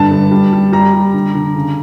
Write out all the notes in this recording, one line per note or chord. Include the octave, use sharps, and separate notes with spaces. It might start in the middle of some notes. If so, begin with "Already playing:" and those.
Already playing: G2 D3 A5
G2
G3
G3
G3 A#5
G3
D3
D3
C#3